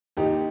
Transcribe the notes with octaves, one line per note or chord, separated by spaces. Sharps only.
D#2 D#3 D#4 G4